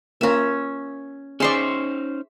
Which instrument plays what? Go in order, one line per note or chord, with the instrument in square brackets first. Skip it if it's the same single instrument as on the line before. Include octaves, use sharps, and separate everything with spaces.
[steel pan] A#3 F4 A#5 [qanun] C#4 E5
[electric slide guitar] C#4 D#4 C5 [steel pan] G#4 D5 [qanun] E5 C6 C#6